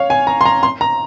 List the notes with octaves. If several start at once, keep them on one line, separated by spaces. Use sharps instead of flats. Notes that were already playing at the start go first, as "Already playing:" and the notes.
Already playing: C#5 F5
G#5
A#5
C6
A#5
C6
A#5